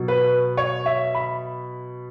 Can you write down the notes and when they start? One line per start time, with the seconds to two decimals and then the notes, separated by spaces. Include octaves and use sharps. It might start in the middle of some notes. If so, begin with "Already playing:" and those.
Already playing: B2 F#3
0.08 B4
0.57 C#5
0.86 E5
1.15 B5